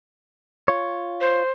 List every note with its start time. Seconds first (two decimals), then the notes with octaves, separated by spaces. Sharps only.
0.68 F4 C#5
1.21 C5